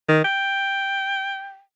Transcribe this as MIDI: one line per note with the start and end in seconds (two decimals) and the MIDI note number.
0.09 0.20 51
0.24 1.61 79